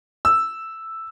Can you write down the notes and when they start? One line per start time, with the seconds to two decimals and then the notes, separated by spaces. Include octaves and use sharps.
0.25 E6